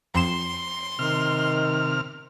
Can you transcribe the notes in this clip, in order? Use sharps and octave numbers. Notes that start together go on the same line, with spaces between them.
F2 C6 E7
C3 D#3 F6